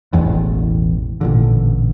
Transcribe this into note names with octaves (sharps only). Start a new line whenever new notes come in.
E1 A1 E2
A1 A#2 D3